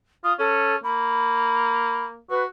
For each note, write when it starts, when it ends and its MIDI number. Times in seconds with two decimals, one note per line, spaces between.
0.24 0.34 65
0.24 0.33 87
0.39 0.75 61
0.39 0.76 69
0.84 2.20 58
0.84 2.05 83
2.30 2.46 66
2.30 2.43 71